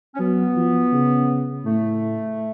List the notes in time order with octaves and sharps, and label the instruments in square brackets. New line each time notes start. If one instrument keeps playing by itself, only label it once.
[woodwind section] C#4
[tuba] F#3 [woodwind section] B3
[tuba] F3
C#3
[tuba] A2 [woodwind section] A3